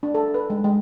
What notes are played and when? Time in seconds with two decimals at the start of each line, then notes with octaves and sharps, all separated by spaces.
0.03 D4
0.14 A4
0.34 B4
0.50 G#3
0.64 G#3